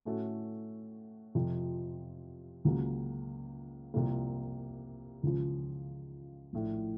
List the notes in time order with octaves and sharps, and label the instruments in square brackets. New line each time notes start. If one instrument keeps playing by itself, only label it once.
[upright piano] A2 A3 C#4 F#4 A4
F2 C3 F3
C#2 C#3 F#3 A#3
C2 C3 F3 A#3
C#2 C#3 F3
A#1 A2 A3